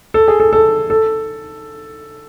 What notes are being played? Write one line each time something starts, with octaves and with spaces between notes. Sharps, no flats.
A4
G#4
A4
A4
A4